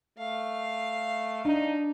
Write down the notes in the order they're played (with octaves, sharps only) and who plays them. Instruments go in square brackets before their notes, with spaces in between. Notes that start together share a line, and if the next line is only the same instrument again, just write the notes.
[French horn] A3 [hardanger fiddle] F5
[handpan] D4 [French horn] D#4